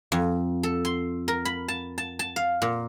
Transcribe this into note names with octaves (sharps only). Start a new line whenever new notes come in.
F2
A4
C6
A#4
B5
A5
A5
A5
F5
A#2